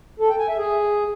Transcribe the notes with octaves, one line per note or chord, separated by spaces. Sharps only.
A4
G5
G#5
E5
G#4